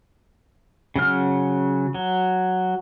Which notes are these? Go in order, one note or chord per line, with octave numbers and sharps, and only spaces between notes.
C#3 F#3 F6
F#3